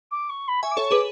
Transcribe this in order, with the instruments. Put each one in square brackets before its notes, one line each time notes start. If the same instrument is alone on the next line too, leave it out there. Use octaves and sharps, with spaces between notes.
[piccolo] D6
C#6
B5
[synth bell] E5 G#5 [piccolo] C#6
[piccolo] D6
[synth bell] A4 C#5 [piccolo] C#6
[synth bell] G#4 B4 [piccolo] D6